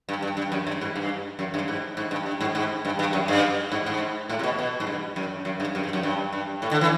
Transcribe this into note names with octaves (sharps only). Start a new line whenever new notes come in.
G2
G2
G2
F#2
G2
G#2
G2
F#2
G2
G#2
G#2
G2
G2
G#2
G#2
G2
G2
F#2
G2
G#2
G#2
A2
C3
B2
B2
G#2
G2
F#2
F#2
G2
F#2
G2
F#2
G2
G2
A2
D3
E3